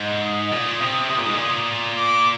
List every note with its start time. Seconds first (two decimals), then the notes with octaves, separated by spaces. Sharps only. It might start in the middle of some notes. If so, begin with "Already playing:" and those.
Already playing: G#2
0.22 D#6
0.52 A#2
0.81 C3
1.10 C3
1.18 A#2
1.26 G#2
1.34 A#2
1.97 D6